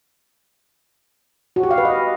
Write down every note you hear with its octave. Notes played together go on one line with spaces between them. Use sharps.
F#4
G4
F5
B4
D#5